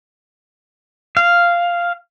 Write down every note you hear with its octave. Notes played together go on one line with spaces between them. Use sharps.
F5